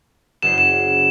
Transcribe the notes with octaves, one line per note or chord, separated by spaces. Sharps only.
F#1 C5 E7
E7